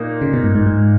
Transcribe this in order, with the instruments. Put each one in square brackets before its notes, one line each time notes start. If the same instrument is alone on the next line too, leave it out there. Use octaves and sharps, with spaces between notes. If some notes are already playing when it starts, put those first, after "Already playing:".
Already playing: [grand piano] A#2 A#3 D#4
[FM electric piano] C#3
B2
G#2
G#2
G#2